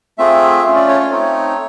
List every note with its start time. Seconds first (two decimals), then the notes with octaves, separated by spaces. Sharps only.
0.18 A3 C4 F4 G#4 E5
0.64 A3 C#4 F4
0.76 D5
0.88 C#5
1.00 C#5
1.10 A3 C4 D#4 C#5